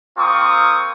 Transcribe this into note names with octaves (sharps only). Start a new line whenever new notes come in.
A#3 C4 F4 C#6 D#6